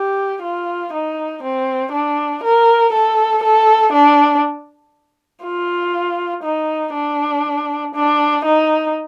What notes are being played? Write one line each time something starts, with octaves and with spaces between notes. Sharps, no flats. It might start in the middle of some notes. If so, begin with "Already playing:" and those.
Already playing: G4
F4
D#4
C4
D4
A#4
A4
A4
D4
F4
D#4
D4
D4
D#4